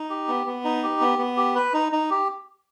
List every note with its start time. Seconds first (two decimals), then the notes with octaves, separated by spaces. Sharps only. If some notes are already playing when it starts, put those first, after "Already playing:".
Already playing: D#4
0.10 G4
0.28 B3
0.47 B3
0.65 D#4
0.83 G4
1.01 B3
1.19 B3
1.37 G4
1.55 B4
1.73 D#4
1.92 D#4
2.10 G4